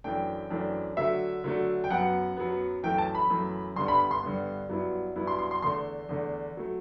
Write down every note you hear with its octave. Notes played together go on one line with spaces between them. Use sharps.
F#2 E3 A3 D4 G5
F#2 E3 A3 D4
D3 F#3 A3 E5
D3 F#3 A3
G5
F#2 F#3 B3 F#5
F#2 F#3 B3
F#2 E3 A3 G5
A5
B5
F#2 E3 A3
G2 D3 G3 B3 C6
B5
B5
C6
G2 D3 G3 B3
G2 F#3 B3 E4
G2 F#3 B3 E4
C6
C6
C6
E2 D3 A3 C6
E2 D3 A3
F#3 A3